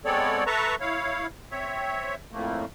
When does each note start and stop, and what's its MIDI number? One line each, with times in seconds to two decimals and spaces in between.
0.05 0.44 56
0.05 0.44 59
0.05 0.44 60
0.05 0.44 69
0.05 0.44 73
0.05 0.44 74
0.47 0.75 69
0.47 0.75 71
0.47 0.75 76
0.47 0.75 81
0.47 0.75 82
0.47 0.75 85
0.81 1.26 64
0.81 1.26 73
0.81 1.26 77
1.51 2.15 60
1.51 2.15 73
1.51 2.15 76
2.32 2.65 41
2.32 2.65 45
2.32 2.65 57
2.32 2.65 58